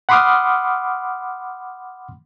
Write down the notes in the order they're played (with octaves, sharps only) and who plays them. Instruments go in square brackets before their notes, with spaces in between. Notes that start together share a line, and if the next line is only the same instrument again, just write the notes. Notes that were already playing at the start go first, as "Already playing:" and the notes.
[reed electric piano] F#5 B5 C6 D6 D#6 F6